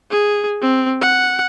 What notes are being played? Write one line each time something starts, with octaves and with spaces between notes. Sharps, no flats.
G#4
C4
F#5